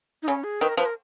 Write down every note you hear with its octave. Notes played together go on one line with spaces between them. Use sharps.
D#4
C#3 C#4
G#4
D#3 B4
A#4
F3 B4
A#4